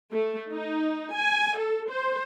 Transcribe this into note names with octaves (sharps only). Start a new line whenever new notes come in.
A3
D#4
G#5
A4
C5